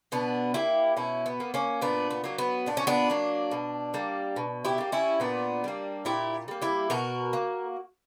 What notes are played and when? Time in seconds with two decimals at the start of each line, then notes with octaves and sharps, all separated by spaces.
0.12 B2 B3 D4
0.54 A#3 E4 G4
0.96 B2 C#4 E4
1.26 B3
1.40 A#3
1.54 A#3 C#4
1.82 A#2 B3 D4
2.11 B3
2.24 F#3 A#3
2.38 B3
2.66 A#2 D4
2.77 C#4
2.87 B3 D4
3.10 F#3 A#3
3.51 B2
3.94 G3 A#3
4.36 B2
4.65 E4 G4
4.78 G3 A#3
4.92 C#4 E4
5.20 A#2 B3 D4
5.64 G3 A#3
6.05 A#2 E4 G4
6.48 G3 A#3
6.62 E4 G4
6.90 B2 F#4 A#4
7.33 A#3